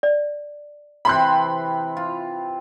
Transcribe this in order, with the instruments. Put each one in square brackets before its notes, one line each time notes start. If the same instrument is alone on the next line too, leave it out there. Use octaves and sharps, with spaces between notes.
[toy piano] D5
[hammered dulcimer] C3 E3 C4 [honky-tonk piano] B5 C6 F#6
[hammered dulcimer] F4